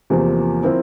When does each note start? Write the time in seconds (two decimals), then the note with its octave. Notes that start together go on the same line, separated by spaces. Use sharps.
0.10 E2 C3 F3 A#3
0.63 F3 C4 E4 A#4